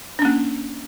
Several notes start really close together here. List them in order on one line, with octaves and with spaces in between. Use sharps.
D4 C#4 A#3